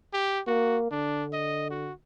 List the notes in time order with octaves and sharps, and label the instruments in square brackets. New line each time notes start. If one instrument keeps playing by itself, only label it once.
[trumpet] G4
[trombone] A#3 [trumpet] F#4
[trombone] D3 [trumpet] D4
[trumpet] D#5
F#4